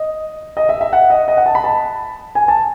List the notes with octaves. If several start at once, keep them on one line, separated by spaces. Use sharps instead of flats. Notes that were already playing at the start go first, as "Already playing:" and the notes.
Already playing: D#5
D#5
E5
E5
F#5
D#5
D#5
F#5
A5
B5
A5
G#5
A5